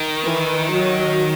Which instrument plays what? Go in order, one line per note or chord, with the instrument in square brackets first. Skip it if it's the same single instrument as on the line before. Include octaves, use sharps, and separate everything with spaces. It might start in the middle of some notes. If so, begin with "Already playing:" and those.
Already playing: [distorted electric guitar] D#3
[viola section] E3
F#3